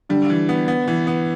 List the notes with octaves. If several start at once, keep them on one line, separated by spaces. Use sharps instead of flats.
D3 G3
E3
B3
B3
E3
B3